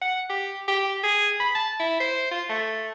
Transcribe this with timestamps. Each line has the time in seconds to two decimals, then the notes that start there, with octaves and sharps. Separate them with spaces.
0.02 F#5
0.30 G4
0.68 G4
1.04 G#4
1.40 B5
1.55 A5
1.80 E4
2.00 C5
2.31 F4
2.50 A3